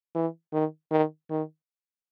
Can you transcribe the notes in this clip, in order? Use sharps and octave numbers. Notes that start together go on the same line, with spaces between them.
E3
D#3
D#3
D#3